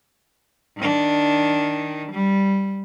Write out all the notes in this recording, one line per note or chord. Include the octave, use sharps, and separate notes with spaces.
D#3 D4
G3